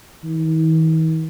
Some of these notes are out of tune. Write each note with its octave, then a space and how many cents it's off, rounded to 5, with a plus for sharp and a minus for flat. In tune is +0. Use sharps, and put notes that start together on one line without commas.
D#3 +45